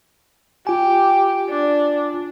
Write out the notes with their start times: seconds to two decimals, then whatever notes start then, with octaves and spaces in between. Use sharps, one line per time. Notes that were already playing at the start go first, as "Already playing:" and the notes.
0.67 F4 G4 G#5
1.50 D4